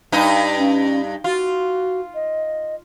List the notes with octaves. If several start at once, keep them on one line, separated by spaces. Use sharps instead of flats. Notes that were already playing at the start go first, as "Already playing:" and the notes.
G2 D#4
C#4
F4 F#4
D#5